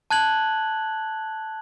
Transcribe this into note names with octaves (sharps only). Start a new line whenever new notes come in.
A5 F#6 G#6 F#7